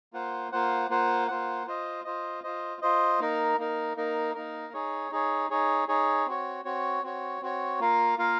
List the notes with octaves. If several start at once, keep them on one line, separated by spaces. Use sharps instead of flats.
A#3 F4 C5 F#5
A#3 F4 C5 F#5
A#3 F4 C5 F#5
A#3 F4 C5 F#5
F4 C5 D#5
F4 C5 D#5
F4 C5 D#5
F4 C5 D#5
A#3 D#4 A#4
A#3 D#4 A#4
A#3 D#4 A#4
A#3 D#4 A#4
D#4 G#4 C#5
D#4 G#4 C#5
D#4 G#4 C#5
D#4 G#4 C#5
C4 F#4 C#5
C4 F#4 C#5
C4 F#4 C#5
C4 F#4 C#5
A#3 F4 A#4 F5
A#3 F4 A#4 F5